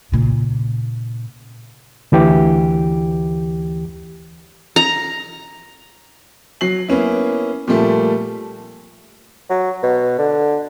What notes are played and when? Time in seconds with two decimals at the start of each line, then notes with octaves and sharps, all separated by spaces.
0.12 A#2 C#3
2.12 D2 E3 G4
4.76 A#5
6.61 F#3 C7 F#7
6.88 A#3 B3 C#4 E4
7.68 A#2 F3 G3 A3 A#3
9.50 F#3
9.83 B2
10.19 D3